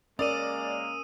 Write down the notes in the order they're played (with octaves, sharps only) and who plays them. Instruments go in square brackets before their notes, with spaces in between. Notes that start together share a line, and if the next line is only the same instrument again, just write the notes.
[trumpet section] G#3 A#3 [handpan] C#4 A#4 [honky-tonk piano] D5 [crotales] D#6 E6 D#7